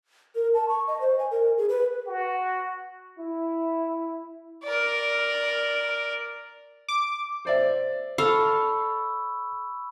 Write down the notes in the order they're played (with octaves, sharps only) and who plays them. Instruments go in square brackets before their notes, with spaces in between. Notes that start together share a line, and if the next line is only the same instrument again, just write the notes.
[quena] A#4
A5
C#6
D#5
C5
G#5
A#4
G#4
B4
[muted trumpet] F#4
[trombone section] E4
[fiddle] A#4 D5
[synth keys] D6
[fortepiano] C5 D5 E5
[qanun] A4 F5 [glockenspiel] B5 C#6 E6